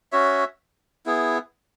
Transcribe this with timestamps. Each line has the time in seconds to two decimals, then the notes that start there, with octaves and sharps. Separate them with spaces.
0.12 C#4 F#4 C#5 E5
1.06 B3 E4 G#4